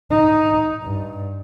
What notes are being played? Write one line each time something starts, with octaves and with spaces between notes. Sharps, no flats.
D#4
G2